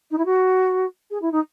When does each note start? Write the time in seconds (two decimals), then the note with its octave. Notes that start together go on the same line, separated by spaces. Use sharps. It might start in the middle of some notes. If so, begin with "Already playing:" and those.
0.11 D#4
0.18 E4
0.25 F#4
1.10 G#4
1.21 E4
1.31 D#4